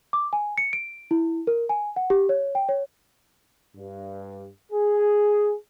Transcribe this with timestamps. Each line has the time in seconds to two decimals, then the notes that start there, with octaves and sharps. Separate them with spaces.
0.13 D6
0.33 G#5
0.58 C#7
0.73 D7
1.11 E4
1.47 A#4
1.69 G#5
1.96 F#5
2.10 G4
2.29 C#5
2.55 G5
2.69 C#5
3.76 G2
4.72 G#4